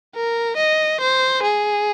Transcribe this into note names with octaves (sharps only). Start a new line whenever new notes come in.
A#4
D#5
C5
G#4